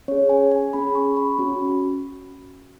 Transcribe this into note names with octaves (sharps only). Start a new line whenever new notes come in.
C#4 G#4 C#5
G#5
G#5
C#4 G#4 B5
C#6
B5
C#4 F#4